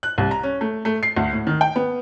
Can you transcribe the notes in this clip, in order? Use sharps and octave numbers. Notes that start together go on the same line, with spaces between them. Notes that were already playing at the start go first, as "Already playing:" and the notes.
F#6
C2
A#5
C#4
A3
A3
C7
D2
A2
D#3
G5
B3